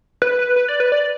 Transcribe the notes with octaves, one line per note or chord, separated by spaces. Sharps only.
B4
B4
B4
D5
B4
D5